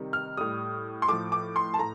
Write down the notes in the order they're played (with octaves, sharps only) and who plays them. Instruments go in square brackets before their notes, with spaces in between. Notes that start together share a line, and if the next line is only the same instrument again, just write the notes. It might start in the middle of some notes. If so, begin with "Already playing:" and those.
Already playing: [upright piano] C3 D#3 G3
F6
A2 G3 D#6
C6
A2 F3 D6
D6
C6
A5
A2 A#5